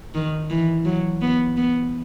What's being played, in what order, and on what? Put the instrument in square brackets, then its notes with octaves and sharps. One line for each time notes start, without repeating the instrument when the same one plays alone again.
[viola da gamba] D#3
E3
F#3
B3
B3